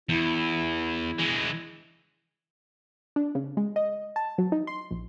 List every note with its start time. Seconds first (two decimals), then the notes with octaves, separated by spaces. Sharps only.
0.09 E2 E4
1.19 E3 G#3
3.16 D4
3.35 C#3
3.57 G#3
3.76 D#5
4.16 A5
4.38 F#3
4.52 D#4
4.67 C6
4.91 A#1